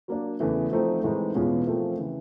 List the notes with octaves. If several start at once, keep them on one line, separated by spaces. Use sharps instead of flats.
F#3 A#3 D4
E2 C#3 E3 A3
F3 A3 C4 D#4
A2 E3 G#3 C4 D#4
E2 B2 G#3 C#4 F4
F3 A3 C4 F4 A#4
C#3 E3